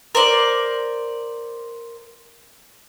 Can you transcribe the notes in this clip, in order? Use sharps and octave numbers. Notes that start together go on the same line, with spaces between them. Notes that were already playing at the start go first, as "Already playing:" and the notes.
A#4 C5 D5